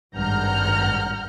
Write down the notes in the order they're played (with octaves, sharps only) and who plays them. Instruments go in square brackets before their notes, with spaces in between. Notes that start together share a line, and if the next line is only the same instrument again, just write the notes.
[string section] G#1 G2 F#5 A#5 F6 G6